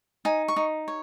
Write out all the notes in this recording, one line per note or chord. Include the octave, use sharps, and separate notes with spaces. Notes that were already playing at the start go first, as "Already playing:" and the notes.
D#4 G#5
C#6
D#4
C#5